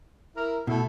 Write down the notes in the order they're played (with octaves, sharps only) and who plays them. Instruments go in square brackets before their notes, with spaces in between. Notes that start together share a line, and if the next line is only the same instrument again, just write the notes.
[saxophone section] E4 A#4
[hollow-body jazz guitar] B2 [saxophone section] A3 E4